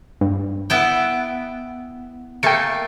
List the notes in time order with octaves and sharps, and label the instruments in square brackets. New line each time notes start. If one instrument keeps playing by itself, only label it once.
[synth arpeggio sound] G2
[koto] B3 E4 G5
[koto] A3 A#3 [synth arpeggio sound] G5 C#7